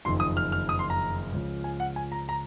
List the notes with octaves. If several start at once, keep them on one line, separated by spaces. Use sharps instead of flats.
F#1 F2 D#3 C6
D#6
F6
F6
D#6
C6
A#5
C#2 C#3 F3
G#5
F#5
G#5
A#5
A#5